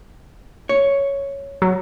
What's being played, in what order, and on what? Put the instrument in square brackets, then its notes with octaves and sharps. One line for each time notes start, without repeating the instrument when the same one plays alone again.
[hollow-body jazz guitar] C#5
[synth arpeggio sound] F#3